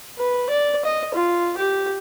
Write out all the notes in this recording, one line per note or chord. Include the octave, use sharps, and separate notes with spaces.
B4
D5
D#5
F4
G4